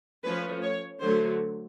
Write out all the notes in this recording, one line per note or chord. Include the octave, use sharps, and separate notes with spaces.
F3 A3 C#4 B4
C#5
D3 F#3 A3 C5